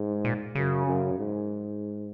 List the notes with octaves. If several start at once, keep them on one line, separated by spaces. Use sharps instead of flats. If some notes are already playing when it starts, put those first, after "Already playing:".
Already playing: G#2
A#2
F#2 C#3
F#2
G#2